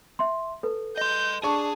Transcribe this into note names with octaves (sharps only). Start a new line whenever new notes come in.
E5 C6
A4 B4
D#5 C6 G6
D4 G#4 A5 C#6